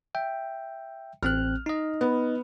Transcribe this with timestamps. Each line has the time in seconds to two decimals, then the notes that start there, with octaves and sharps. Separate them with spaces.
0.15 E5 G5
1.23 A1 C4 F6 F#6
1.66 D#4 D#5
2.01 B3